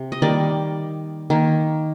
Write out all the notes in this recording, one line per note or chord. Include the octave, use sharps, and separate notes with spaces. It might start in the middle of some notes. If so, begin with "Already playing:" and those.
Already playing: C3
D#5
D#3 G3 A#3 D5
D#3 A#3